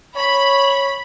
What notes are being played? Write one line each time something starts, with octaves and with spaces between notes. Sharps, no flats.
C#5 B5